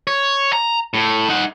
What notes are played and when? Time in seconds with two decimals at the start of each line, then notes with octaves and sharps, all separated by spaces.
0.07 C#5
0.53 A#5
0.94 A2
1.29 D#4 F#5